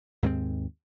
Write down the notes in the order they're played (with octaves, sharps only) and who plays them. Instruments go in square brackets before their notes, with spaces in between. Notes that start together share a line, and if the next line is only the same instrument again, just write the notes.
[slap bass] D#2 G#2 B3 C4